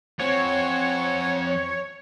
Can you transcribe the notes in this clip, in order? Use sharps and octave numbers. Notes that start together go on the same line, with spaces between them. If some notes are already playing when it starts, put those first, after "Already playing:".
F3 C4 C#5 F#5 G#5 C#6